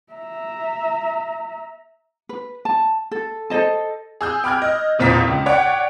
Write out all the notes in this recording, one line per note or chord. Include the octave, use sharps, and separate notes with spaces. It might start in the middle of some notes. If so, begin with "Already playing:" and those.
E5 A#5
B4
A5
A4
A4 C5 D#5 A5
G#4 E6 G6
G5 B5 D6 F6 F#6 G#6
D#5
B1 E2 A#2 C4 A#5 B6
C#2
C#5 D5 F#5 G5